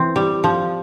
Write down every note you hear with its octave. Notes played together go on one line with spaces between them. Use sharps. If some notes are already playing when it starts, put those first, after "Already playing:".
Already playing: E3 C4
G3
F3